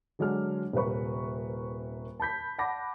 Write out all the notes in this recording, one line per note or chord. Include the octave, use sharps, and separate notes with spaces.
D3 F#3 G#3 D4 F6
D#1 C3 A#4 B4 C#6
A5 B5 G6 B6
F#5 A5 B5 D6 A#6